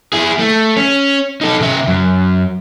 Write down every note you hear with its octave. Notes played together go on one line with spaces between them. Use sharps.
E4 G#4
A3
C#4
D#4 A4
C#3 E5
F#2